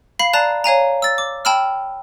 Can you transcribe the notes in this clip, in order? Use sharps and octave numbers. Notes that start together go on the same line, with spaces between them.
F5 B5 C7
D5 A5 A#5 F#6
C#5 F5 G#5 A#5
E6 A6
D6
G5 A5 B5 E6 F6